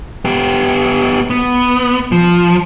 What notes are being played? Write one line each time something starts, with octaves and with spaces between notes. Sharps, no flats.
B3 G4
B3
F3